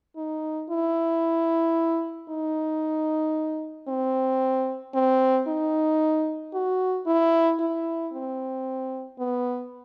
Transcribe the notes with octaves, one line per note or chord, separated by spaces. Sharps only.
D#4
E4
D#4
C4
C4
D#4
F#4
E4
E4
C4
B3